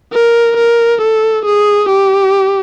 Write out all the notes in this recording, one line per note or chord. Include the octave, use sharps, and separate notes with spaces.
A#4
A#4
A4
G#4
G4